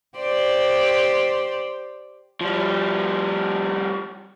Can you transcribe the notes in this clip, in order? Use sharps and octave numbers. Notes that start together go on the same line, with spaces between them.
G4 C5 D5
F3 G3